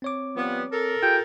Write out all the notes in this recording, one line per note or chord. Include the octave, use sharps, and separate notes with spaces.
C4 C#5 D6
F3 G3 B3
A4 A#4
F4 G4 G#4 G5